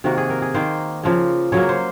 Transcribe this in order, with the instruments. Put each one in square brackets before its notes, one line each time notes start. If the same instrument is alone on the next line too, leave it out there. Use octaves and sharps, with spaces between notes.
[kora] C3 D#3 A#3 F#4
G#4
A#4
G#4
D#3 A#3 C5
C#3 F3 A#3
C#3 F#3 A#3 C#5
C5